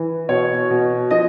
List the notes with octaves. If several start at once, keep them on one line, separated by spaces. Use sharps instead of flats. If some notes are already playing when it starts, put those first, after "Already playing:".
Already playing: E3
B2 C#5
B2
F3 D#5